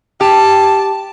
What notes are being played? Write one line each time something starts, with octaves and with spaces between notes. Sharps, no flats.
G4 A5